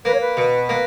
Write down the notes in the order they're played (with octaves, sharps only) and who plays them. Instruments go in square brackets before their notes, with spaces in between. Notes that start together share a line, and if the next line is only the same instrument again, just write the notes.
[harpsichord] A#3 [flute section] B4
[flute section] C#5
B4
[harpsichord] B2
A#3